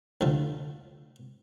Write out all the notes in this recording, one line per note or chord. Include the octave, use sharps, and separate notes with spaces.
D2 D3 F3